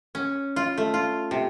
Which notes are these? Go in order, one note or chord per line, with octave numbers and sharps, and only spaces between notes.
C#4
F4
A3
F4
C3